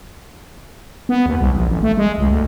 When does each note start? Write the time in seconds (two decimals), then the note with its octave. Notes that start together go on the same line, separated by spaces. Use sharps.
1.09 B3
1.26 D#2
1.40 C2
1.55 A#1
1.68 A1
1.83 A3
1.98 G#3
2.18 C#2
2.30 D2